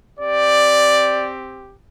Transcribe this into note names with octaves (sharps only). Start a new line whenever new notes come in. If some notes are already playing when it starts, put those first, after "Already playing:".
C4 G4 D5